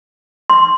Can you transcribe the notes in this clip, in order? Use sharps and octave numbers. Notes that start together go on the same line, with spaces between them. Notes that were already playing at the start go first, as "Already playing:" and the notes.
C6